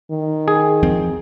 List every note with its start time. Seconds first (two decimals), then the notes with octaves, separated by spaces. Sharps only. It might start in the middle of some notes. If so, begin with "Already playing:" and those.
0.11 D#3
0.48 G#4
0.83 E2 F3 C4